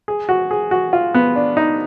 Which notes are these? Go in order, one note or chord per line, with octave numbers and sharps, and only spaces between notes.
G#4
F#4
G#4
F#4
F4
B3
D4
D#4